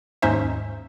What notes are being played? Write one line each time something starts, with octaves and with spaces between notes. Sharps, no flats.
D#2 G#2 C#4 D#4 C5 E5